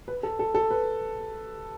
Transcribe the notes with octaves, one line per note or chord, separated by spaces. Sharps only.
B4
A4
A4
A4
B4